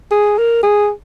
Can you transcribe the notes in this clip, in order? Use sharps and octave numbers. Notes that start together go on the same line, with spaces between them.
G#4
A#4
G#4